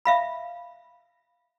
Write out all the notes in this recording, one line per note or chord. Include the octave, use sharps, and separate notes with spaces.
E5 F5 B5